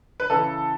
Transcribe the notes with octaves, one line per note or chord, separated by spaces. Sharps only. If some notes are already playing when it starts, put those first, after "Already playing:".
B4
C#3 E3 A4